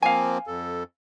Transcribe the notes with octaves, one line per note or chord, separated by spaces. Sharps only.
F3 A#3 C4 F5 G#5
F2 A4